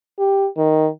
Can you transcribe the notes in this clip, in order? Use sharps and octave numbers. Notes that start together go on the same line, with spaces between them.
G4
D#3